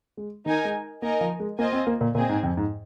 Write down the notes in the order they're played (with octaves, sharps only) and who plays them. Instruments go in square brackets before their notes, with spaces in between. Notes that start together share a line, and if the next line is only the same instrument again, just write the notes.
[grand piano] G#3
[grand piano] D#3 [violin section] D#4 A#4 G#5
[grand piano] G#3
[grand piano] A#3 [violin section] D#4 A#4 D#5 G#5
[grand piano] F3
G#3
[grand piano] A#3 [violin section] F4 C5 D#5 G#5
[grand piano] C4
A#3
A#2
[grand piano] A#2 [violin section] C4 G#4 D#5 G#5
[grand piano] G#2
F2
G#2